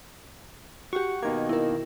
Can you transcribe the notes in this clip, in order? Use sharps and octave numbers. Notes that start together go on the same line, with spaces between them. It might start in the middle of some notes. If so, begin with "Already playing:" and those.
F#4 G4 F#5 C#6
B2 D#3 A#3 G#6
E4 A#4